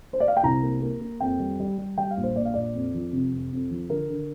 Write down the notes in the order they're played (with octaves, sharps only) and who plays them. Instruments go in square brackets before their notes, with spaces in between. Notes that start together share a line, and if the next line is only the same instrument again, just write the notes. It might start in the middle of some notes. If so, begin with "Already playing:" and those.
[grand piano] C5
D5
F5
G5
C2 A#5
A#3
A#3
A#3
F2 G5
G3
G3
G3
G3 G5
F5
A#1
C5
A#1 D5
F5
A#1 D5
F2
F3
C3
F2
F2
F3
D3 A#4
D3